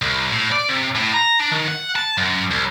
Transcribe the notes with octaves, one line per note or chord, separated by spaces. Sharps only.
C2
A2
D5
C3
A2
A#5
D4
D#3
F#5
A5
F#2
C2